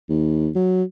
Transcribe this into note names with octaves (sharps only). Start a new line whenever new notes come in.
D#2
F#3